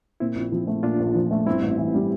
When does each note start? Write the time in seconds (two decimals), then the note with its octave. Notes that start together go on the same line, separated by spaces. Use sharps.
0.20 A#2 C4 E4
0.36 A#1
0.52 F3
0.67 A3
0.83 A#2 D4 F4
1.00 A#1
1.14 F3
1.31 A3
1.46 G2 C4 E4
1.62 A1
1.78 E3
1.94 G3